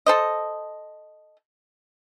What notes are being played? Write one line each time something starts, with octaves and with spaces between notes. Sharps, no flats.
A4 C5 D#5